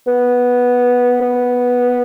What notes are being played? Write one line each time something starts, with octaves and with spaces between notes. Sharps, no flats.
B3
B3